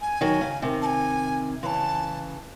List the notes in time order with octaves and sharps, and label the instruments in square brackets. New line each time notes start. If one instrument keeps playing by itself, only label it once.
[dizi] G#5
[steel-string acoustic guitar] D#3 F#3
C#3
C3 D#3
[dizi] A5
G#5
[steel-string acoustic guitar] C#3 E3 [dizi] C6
[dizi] A5